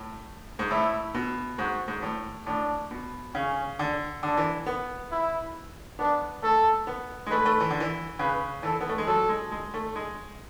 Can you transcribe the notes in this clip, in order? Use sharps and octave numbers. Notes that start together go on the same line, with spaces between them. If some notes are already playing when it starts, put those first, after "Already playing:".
Already playing: A2
G#2
A2 E4
B2
G#2 F#4
G#2
A2
A2 D4
B2
C#3 C#4
D3
D3 D4
E3
B3
E4
B3 D4
A3 A4
B3
G#3
A3 B4
A3
E3
D3
E3
C#3 B4
E3 A4
B3
A3
G#3
F#3 A4
G#3
G#3
A3
G#3